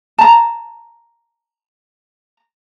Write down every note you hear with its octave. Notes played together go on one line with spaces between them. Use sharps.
A5 A#5